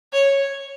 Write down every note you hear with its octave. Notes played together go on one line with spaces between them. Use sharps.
C#5